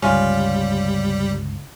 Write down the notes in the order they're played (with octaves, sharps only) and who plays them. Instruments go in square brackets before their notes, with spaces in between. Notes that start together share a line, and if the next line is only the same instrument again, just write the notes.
[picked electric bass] G1 C#2 [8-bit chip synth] G3 [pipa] C#4 F4